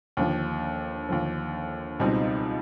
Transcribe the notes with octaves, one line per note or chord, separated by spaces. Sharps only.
D#2 D3 F3
D#2 D3 F3
C#2 B2 G3 C4 D#4